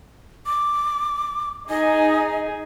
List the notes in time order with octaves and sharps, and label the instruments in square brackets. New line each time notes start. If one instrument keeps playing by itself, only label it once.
[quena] D6
[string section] D#4 G#4 G#5 [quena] D#5